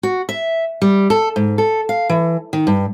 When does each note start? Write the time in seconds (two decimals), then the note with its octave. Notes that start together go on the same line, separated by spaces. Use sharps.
0.03 F#4
0.29 E5
0.82 G3
1.10 A4
1.36 G#2
1.58 A4
1.89 F5
2.09 E3
2.53 D#3
2.67 G2